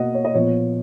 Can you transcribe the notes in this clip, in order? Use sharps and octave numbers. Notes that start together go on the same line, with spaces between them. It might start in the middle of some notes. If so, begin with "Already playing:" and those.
Already playing: B2 A#3 D#5 F#5
C#5
D#5
A#2 F3 B3 C#5